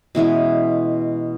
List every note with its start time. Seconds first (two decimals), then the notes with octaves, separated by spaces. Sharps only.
0.15 B2 E3 G#3 C#4